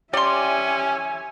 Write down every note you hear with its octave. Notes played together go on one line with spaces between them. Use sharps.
C#4 G4 D5 E5 G#5 C6